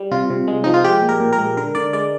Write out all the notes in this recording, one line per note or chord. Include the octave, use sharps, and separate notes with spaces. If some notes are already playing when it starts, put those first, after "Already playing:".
Already playing: G3
C3 F4
C3
G#3
F3 D#4
F4
G#3 G4
A#2
A#4
A#2
A#4
G#3
D3 A#4
D3 D5
G#3 D5